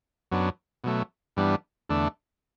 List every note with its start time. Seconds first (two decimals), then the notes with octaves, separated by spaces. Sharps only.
0.32 F#2 F#3 B3 D4
0.84 B2 F#3 A3
1.37 G2 E3 G3 B3 D4
1.90 E2 D3 A3 D4